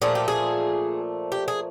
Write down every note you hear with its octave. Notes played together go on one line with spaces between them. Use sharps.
A#2 F3 A3 G#4
G4
G#4
G4
G#4